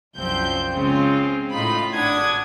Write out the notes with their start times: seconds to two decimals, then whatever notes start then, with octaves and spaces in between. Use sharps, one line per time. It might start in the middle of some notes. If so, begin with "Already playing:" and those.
0.16 C2 F#2 F3 C4 G6
0.72 C#3 G#3 C4 F4
1.52 A2 D#4 F4 B5
1.94 G#1 D4 F#5 D#6 G#6